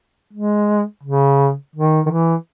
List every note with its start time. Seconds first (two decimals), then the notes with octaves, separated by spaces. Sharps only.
0.33 G#3
1.04 C#3
1.76 D#3
2.06 D#3
2.10 E3